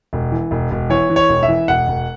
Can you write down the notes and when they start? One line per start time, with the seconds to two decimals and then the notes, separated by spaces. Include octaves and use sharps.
0.13 E1
0.32 E3
0.51 E1
0.71 E1
0.90 E3 C#5
1.10 E3
1.16 C#5
1.29 E1
1.43 E5
1.48 E3
1.68 E1 F#5
1.88 E1